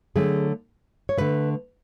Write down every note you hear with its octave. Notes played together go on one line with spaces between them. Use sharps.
D3 F#3 A3 G#4
C#5
D3 A3 B4